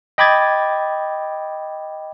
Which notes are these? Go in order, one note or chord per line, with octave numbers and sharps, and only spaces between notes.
D#5 G5 B5 D6 G#6 A6